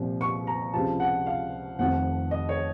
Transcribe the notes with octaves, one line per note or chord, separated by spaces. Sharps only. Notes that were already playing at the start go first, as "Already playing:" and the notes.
Already playing: C2 A#2 F3
C#6
A#5
C#2 C3 F3 A5
F#5
F5
F1 F2 D#3 F#5
D#5
C#5